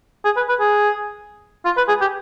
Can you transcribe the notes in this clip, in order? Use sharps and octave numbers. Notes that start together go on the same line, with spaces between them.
G#4
B4
B4
G#4
F4
B4
G#4
G4